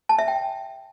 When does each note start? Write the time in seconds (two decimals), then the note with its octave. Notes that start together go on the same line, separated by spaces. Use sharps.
0.09 A5
0.19 E5
0.28 G5